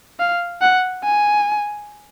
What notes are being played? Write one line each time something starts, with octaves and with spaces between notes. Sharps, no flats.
F5
F#5
G#5